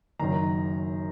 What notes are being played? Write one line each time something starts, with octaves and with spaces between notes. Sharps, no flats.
F#1 F#2 D#3 F#3 A#5